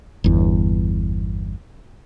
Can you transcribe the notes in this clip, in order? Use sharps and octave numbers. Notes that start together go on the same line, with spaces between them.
G1 E2